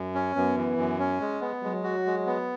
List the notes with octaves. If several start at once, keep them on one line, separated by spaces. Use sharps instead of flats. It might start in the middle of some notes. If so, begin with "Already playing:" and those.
Already playing: F#2
C#4
F#2 B3
E3
F#2
C#4
G#3
B3
F#3 G#3
F#4
G#3
B3